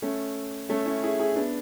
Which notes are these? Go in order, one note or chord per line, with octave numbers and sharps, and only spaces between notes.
A3 C#4
A3 C#4
C#4 E4
E4 G#4
E4 G#4
B3 D4